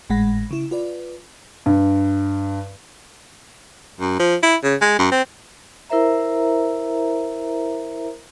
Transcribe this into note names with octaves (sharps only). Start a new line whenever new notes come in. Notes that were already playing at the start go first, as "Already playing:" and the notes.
G#1 A2 G#3 F#5 B5 A#6
C#3 E4
F4 B4 D5
G2
F#2
F3
E4
C#3
G#3
F#2
C4
E4 A#4 C5 E5 A#5